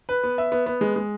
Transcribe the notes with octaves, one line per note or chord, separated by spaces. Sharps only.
B4
B3
E5
B3
B3
G#3
G#3